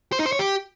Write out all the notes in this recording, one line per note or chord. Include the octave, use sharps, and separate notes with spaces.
C5
D#4
C5
C#5
G4